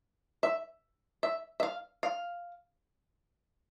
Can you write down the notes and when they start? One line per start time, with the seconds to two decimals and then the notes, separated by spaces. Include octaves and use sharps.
0.43 E5
1.23 E5
1.60 E5
1.63 F5
2.03 F5